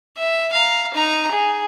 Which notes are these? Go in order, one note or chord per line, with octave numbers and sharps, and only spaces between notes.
E5
F5 A#5
D#4 A#5
G#4